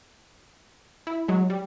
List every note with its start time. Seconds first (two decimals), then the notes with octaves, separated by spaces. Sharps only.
1.07 E4
1.28 F#3 G#3
1.50 G3